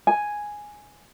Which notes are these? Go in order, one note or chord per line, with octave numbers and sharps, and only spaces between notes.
G#5